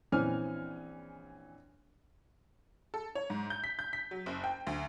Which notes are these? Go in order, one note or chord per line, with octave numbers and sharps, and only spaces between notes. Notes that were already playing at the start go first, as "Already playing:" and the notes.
A#1 E3 C4 C#4 G#5 F6
A4
C#5
G#2
G6
B6
G6
B6
F#3
F#1
G5
D2